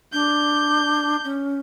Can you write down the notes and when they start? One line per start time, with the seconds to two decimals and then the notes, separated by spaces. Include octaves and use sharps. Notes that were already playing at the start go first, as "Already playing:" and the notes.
0.13 D4 G6
1.24 C#4